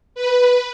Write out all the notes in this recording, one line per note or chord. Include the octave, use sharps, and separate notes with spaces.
B4